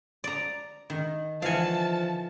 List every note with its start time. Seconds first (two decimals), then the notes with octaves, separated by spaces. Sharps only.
0.24 D5 A#5
0.90 D#3
1.42 D3 E3 F3 F5 G#5 A5 C#6